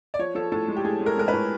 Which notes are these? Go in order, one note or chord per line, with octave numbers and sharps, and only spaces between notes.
D5
F3 C#5
F3 A4
A2 A4
G#3
G4
A2 G#4
G#3
A#4
G#3 A#4
B4
A2